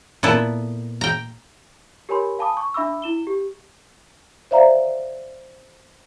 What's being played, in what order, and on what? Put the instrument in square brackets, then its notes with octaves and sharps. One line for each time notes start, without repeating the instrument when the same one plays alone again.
[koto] A#2 B3 E4 A4
G5 A#5
[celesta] G4 A#4 C#5 G#5 B5 C6
F5 G#5 A5 B5 D6 D#6
C#6
D4 E5 B5 D6 E6
E4 E7 G7
G4
[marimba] C5 D5 E5 F5 A#5